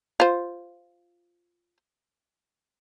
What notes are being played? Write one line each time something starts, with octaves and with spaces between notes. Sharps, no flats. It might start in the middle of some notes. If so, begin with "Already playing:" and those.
F4 C5